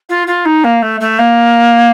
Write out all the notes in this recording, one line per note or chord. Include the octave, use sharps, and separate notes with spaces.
F4
F4
D#4
A#3
A3
A3
A#3